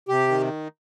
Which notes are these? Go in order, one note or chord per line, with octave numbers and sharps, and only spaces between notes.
C3 G4
D#3